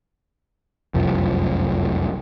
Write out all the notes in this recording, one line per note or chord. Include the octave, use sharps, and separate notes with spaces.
F1 C2 F#2 F3